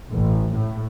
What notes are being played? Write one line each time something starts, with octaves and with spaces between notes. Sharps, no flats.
A1
A2